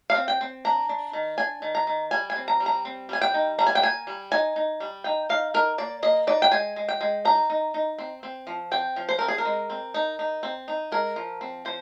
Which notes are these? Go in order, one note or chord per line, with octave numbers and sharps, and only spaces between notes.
F5
C4
G5
C4
D4 A#5
D4
D#3
D4 G#5
D#3
A#5
D#3
G3 G#5
G#5
C4
A#5
G3
A#5
C4
G3 G#5
G5
D#4
G3 A#5
G#5
G5
A#3 G#5
G3
D#4 G#5
D#4
G3
D#4 G5
D#4 F5
D#4 A#4
A#3 D5
A#3 D#5
D#4 D5
G5
G#3 G#5
G#3
G5
G#3
D#4 A#5
D#4
D#4
C4
C4
F3
C4 G5
F3
C5
C4 A#4
G#4
A#4
G#3
C4
D#4
D#4
C4
D#4
G#3 A#4
F3
C4
F3 C5